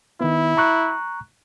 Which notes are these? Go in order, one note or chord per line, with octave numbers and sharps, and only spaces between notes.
D#3 B3 E4
A#5 C#6 F#6